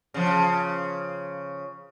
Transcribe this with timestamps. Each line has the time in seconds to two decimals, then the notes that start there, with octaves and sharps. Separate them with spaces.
0.14 C#3 F3